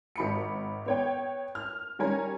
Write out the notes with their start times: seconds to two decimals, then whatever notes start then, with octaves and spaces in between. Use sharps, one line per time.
0.16 G#1 B5 C#7
0.86 B3 C#5 G5
1.55 F6
1.99 D#3 G3 C#4 C#5 G#5 A#5